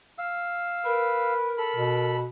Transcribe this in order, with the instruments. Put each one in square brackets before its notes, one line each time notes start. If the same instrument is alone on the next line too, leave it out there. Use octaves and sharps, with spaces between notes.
[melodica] F5 E6
[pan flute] A#4 [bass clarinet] B4
[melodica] A4 B5
[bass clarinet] B2